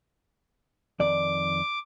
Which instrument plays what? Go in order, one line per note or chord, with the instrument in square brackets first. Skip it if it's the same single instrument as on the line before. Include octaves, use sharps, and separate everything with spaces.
[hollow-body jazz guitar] F2 D#3 D5 [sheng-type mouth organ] D6